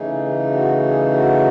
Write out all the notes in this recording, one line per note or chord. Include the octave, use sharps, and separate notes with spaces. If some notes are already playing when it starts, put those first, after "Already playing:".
Already playing: C#3 E3 A3 D#4 G#4
F#4
G#4
F#4